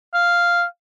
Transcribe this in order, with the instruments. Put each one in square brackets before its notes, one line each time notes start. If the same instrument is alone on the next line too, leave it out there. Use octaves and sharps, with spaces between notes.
[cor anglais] F5